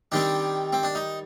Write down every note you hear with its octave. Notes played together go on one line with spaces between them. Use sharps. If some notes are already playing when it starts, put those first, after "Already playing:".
D#3 G3 C4 D4
C4
D4
D#4